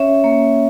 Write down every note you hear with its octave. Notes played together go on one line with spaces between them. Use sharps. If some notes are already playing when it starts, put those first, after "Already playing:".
Already playing: C#4 C#5 E5
A#3